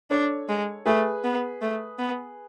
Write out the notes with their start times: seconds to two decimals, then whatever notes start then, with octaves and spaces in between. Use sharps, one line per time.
0.10 D4 A4 C#5
0.49 G#3
0.86 A3 G#4 B4
1.24 B3
1.61 A3
1.99 B3